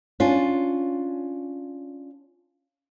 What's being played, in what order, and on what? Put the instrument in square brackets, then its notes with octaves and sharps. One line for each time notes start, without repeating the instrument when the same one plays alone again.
[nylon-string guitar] C#4 D4 F4